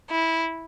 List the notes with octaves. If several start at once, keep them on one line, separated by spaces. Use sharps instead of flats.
E4